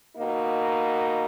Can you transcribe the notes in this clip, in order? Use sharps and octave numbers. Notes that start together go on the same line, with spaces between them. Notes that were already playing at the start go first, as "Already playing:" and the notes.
B2 A#3 D#4